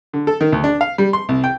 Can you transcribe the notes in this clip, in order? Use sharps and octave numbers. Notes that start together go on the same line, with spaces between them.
D3
A4
D#3
D2
D4
F5
G3
C6
C2
G5